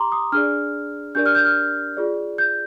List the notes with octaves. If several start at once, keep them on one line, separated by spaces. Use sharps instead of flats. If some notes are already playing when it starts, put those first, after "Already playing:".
Already playing: G4 A#5 C6 D6
D#6
D4 G#4 D5 F6
D4 G4 A#4 D5 G6
F6
G6
F6
F4 G#4 D5
G6